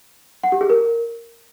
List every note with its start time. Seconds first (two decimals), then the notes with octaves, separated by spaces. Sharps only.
0.43 F#5
0.52 G4
0.61 G#4
0.70 A#4